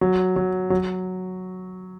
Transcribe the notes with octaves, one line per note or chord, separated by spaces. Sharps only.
F#3
F#3
F#3